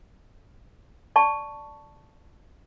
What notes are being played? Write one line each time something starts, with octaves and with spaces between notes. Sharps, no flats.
D5 A5 C#6